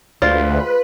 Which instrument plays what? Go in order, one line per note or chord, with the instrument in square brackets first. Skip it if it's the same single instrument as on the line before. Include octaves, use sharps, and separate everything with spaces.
[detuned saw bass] D2 [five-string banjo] G#3 C5 D5 [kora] F4 [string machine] B4